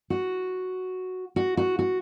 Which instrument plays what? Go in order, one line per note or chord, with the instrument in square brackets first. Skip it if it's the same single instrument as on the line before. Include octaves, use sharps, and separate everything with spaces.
[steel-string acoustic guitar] F#4
F#4
F#4
F#4